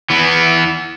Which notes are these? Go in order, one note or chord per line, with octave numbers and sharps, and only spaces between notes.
E3 B3